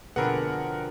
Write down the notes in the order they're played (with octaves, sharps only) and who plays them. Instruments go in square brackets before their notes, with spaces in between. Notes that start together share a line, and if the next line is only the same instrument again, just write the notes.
[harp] F2 D3 C4 [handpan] B2 G#4 B4 [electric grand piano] A#4 F#5